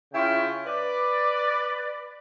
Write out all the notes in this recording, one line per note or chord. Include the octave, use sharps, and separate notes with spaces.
C#3 E4 F4 C#5 G5
B4 D5